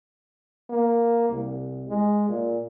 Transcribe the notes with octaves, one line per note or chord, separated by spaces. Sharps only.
A#3
C2
G#3
A#2